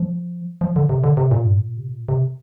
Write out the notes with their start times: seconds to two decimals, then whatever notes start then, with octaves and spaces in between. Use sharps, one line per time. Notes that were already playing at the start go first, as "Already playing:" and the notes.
Already playing: F3
0.61 F3
0.76 D3
0.89 C3
1.04 D3
1.17 C3
1.31 A#2
1.44 G2
1.57 A#2
1.77 C3
1.87 A#2
2.08 C3